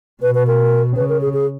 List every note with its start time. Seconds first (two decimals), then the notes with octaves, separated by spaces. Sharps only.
0.22 B2 B4
0.35 B4
0.47 A#4
0.96 C#3 B4
1.09 A#4
1.21 G#4
1.33 G#4